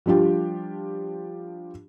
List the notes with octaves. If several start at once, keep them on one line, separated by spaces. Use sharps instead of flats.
F3 G3 D4 F4 G4